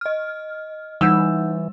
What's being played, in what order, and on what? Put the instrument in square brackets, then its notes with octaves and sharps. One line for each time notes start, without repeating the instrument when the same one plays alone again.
[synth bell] D#5 F6
[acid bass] E3 [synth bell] G3 [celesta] D#4 F#5 G6 [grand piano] E6